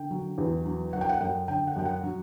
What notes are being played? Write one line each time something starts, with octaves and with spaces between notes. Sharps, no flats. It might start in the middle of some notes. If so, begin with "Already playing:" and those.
Already playing: D3 G5
F#3
E2
F#3
F#3 F#5
G5
F#5
F#2 G5
D3 G5
F#5
F#2 G5
F#5
F#3